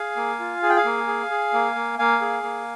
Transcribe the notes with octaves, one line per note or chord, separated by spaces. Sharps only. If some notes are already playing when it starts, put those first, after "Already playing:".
Already playing: G#4 F5 G#5
A#3
F4
G#4 G#5
G5
F5 G#5
A#3
G#4
G#4
A#3
A#3
A#3 F5 G#5
G#4
A#3